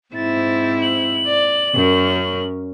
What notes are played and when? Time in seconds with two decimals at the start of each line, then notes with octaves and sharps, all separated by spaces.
0.15 G#2 C4 E4 A6
0.82 F#7
1.26 D5
1.75 F#2 C#4 A#4